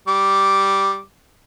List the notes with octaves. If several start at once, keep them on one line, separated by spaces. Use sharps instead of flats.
G3 D6